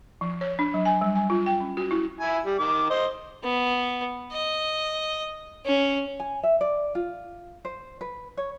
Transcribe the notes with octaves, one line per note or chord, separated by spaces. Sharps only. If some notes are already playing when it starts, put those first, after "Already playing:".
F3
C#5
D4
F#3
G#5
G3
G#5
F4
G5
C#4
F#4
E4
E4 G#5
G3
D#3 D6
C5 D#5
B3
D#5
C#4
G#5
E5
D5
F4
C5
B4
C#5